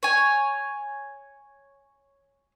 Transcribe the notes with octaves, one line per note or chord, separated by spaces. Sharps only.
C#5 G#5